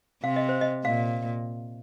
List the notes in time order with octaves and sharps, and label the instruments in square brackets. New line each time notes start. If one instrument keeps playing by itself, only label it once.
[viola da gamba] C3 [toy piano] F5
[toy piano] D#5
C5
D#5
[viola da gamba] A#2 [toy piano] F5